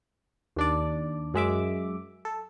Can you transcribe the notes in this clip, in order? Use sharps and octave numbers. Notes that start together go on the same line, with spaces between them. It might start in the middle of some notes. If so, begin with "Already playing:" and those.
D#2 D4 D5
F#2 G#3 E5 D6
A4